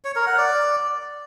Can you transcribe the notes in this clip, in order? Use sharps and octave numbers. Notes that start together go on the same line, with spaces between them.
C#5
A#4
F#5
D5